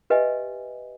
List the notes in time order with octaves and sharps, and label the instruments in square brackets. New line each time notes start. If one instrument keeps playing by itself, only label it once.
[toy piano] G4 B4 D#5 E5 G#5